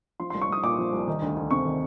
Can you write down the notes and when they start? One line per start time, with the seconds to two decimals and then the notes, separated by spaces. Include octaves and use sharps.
0.20 F3 C6
0.30 C6
0.34 C2
0.42 C#6
0.49 C2 D#6
0.63 A#2 D6
0.78 F3
0.92 C2
1.07 D#3
1.22 D2
1.37 D2
1.51 C3 C#6
1.65 D#3